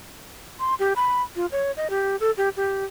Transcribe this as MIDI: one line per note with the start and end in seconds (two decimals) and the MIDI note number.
0.60 0.75 84
0.79 0.93 67
0.96 1.22 83
1.36 1.46 65
1.52 1.71 73
1.77 1.88 75
1.90 2.16 67
2.20 2.31 69
2.37 2.49 67
2.57 2.85 67